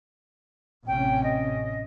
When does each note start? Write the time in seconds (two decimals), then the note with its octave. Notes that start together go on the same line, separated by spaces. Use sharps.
0.87 A1 C3 C#4 G5
1.23 D#5